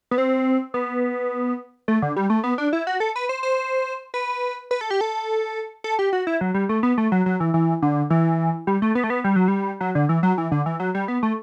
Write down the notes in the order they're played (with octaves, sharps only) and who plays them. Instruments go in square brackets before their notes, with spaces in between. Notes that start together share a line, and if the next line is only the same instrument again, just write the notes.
[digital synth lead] B3
C4
B3
A3
D3
G3
A3
B3
D4
E4
F#4
A4
B4
C5
C5
B4
B4
A4
G4
A4
A4
G4
F#4
E4
F#3
G3
A3
B3
A3
F#3
F#3
E3
E3
D3
E3
G3
A3
B3
A3
B3
G3
F#3
G3
F#3
D3
E3
F#3
E3
D3
E3
F#3
G3
B3
A3